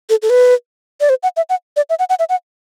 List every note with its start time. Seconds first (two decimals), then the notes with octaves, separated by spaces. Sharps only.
0.10 A4
0.22 A4
0.30 B4
1.01 D5
1.09 C5
1.23 F#5
1.37 E5
1.50 F#5
1.76 D5
1.90 E5
1.99 F#5
2.10 F#5
2.19 E5
2.29 F#5